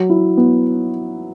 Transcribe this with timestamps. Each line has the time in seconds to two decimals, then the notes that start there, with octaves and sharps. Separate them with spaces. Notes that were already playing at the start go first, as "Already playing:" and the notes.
Already playing: F#3
0.10 E4
0.37 B3